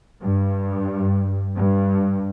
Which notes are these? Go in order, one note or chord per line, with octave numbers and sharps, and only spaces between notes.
G2
G2